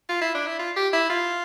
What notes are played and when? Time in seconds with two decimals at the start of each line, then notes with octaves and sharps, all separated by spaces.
0.09 F4
0.21 E4
0.35 D4
0.47 E4
0.59 F4
0.76 G4
0.93 E4
1.10 F4